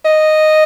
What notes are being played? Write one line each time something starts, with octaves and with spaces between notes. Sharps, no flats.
D#5